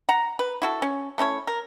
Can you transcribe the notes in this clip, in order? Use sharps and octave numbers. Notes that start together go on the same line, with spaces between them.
F#5 A#5
B4
E4 F#4 A4
C#4
A3 C#4 E4 C#5
A#4